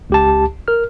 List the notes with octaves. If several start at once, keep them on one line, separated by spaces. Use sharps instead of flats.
C#2 G4 A5
A#4 F6